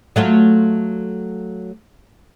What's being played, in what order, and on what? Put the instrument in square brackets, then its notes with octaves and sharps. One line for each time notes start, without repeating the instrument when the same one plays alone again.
[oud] F#3 A3 F4